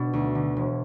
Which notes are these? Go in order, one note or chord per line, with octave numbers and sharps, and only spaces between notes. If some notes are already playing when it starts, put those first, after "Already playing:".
Already playing: B2 B3 D4
D2
D3
E1